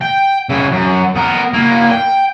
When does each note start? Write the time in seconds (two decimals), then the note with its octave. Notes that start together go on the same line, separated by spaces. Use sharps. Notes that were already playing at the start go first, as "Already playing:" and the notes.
0.01 G5
0.50 C#3 E4
0.72 F#2
1.16 B3 A#4
1.53 A#3 E4
1.91 G5